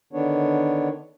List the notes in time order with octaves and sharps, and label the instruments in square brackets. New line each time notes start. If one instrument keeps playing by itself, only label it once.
[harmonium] D3 D#3 B3 D4 C#5